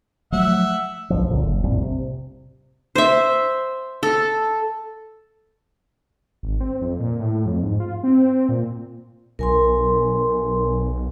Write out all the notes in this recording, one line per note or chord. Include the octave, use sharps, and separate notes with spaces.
F3 F#3 A3 E5 F#5
B1 G2 F3
C#2 A#2 D3
F#1
A#1 F2 A2 G3
C3
C5 E5
A4
G#1
C4
F2
A#2
A2
F2
G#2
F4
C4
A#2
B1 A#4 G#5 C6